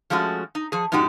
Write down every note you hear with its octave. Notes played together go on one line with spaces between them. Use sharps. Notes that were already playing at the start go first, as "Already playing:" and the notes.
F3 G#3 A3 C#4 F#4
D#4
F3 G#4
F#2 A2 D#4 F#4 G4